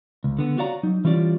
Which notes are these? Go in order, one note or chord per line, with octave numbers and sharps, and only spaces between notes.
C#2
D3 B3
F#4 C#5 D5 F5 F#5 A#5
F#3 D#4
E3 G3 C#4 F4 D5